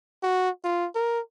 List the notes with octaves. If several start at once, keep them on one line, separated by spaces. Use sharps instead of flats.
F#4
F4
A#4